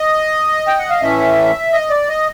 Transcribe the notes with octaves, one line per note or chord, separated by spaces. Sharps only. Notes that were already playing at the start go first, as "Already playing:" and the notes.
Already playing: D#5
G5
F#5
F5
A2 E3 A3 C#4 E5
D#5
D5
D#5